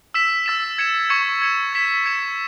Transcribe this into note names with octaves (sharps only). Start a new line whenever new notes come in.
E6 B6 E7
E6 A6 E7
G#6 C#7 E7
C#6 G#6 C#7 E7
G#6 C#7 E7
G#6 B6 E7
G#6 C#7 E7